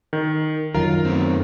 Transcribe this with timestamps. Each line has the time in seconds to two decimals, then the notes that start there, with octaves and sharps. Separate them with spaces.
0.13 D#3
0.74 F#2 D#3 F#3 F4 A#4
1.05 A3 B3 C4